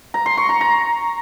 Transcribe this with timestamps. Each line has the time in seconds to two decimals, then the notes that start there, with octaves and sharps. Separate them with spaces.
0.14 A#5
0.26 C6
0.37 C#6
0.49 A#5
0.61 A#5